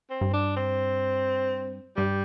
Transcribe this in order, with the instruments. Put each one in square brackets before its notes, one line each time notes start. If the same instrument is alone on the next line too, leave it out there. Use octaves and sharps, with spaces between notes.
[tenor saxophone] C4
[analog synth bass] G2
[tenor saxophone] D4
C4
[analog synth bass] G2 [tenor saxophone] G3